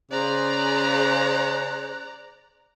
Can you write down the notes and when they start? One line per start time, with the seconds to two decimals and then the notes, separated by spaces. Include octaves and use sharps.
0.11 C#3 G#4 C5 D5 A#5 F#6